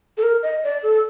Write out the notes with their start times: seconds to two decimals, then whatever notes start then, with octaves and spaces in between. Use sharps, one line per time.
0.18 A4
0.23 A#4
0.43 D#5
0.64 D5
0.83 A4